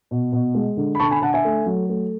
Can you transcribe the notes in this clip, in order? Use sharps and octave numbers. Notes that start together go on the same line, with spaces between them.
B2
B2
G#3
D3
B5
D3 A5 C#6
G#5 B5
D3 F#5 A5
E5 G#5
A3
F#3
A3